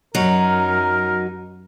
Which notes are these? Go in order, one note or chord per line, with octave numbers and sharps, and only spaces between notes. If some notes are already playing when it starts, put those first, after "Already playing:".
F#2 F#3 D#4 A#4